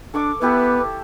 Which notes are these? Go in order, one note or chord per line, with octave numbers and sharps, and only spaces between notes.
D4 A4 C#6 D6
B3 E4 G4 A4 B4